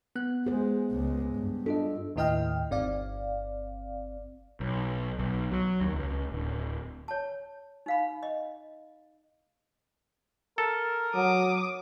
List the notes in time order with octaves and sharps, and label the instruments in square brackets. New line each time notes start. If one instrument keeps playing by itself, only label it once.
[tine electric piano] B3 F#6
[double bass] G#3 [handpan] G#4 C5
[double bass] C#2 G#3
G2
[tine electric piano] D4 F4 D#5 [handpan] A4
[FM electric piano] D#2 A2 E4 D#5 G5 F6
G1 C4 D5 F5
[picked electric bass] B1
B1
F#3
D#2
C#2
D1
[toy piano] C#5 A5
D#4 F5 B5
D#5
[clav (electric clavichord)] A4 [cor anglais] A#4
[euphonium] F#3 [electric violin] D6 D#6